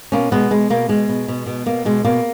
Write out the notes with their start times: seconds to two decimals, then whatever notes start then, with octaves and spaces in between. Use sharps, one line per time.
0.12 B2 A#3 C#4
0.31 B2 G#3 B3
0.51 B2 G#3
0.70 B2 A#3
0.89 B2 G#3
1.09 B2
1.28 B2
1.47 B2
1.66 B2 A#3
1.85 B2 G#3
2.05 B2 A#3